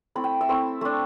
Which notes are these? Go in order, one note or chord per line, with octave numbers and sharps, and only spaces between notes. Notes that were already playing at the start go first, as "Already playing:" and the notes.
A3 C4 E4 B5
G5
E5
A3 C4 E4
A3 D4